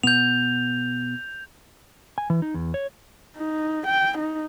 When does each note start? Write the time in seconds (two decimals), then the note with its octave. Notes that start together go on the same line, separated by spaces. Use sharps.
0.03 B2 B3 G6 F7
2.18 G#5
2.30 E3
2.42 D#4
2.54 E2
2.74 C#5
3.37 D#4
3.87 G5
4.18 D#4